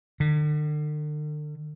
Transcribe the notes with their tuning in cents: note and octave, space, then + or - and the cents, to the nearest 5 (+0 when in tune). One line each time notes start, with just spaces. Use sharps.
D3 +45